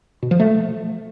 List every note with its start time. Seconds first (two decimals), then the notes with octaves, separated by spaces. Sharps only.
0.23 B2
0.31 F3
0.40 A3